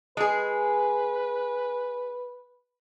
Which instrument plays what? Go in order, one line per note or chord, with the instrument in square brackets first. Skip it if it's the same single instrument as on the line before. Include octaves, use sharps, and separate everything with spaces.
[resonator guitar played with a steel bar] G#3 G#4 [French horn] B4